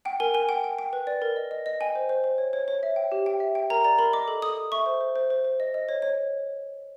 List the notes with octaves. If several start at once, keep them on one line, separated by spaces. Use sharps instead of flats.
F#5 G5
A#4 G#5
A#4 G#5
F#5 G5
G5
G5
B4
D5
A#4
D#5
D#5
D#5
G5 G#5
C5
C5
C5
C#5
C#5
C#5
E5
G5
G4
G5
E5
G5
A#4 A#5
D5 A#5
A#4 B5
D#5 D6
A4
A4 D#6
A4
E5 C#6
C5
C5
C5
C5
C5
D#5
D#5
C#5
C#5